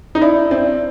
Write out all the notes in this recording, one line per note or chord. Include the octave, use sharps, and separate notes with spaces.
D#4
D4 E4
C4 D4